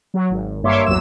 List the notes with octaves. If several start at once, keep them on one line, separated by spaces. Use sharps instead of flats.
F#3
G#1
G2 A#3 C#5 E5 C6 D6
A1 E2 F#3 E6 E7